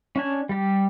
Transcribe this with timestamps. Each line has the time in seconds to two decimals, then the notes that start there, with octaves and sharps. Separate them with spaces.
0.16 C#4 D4 G#5
0.49 G3 G4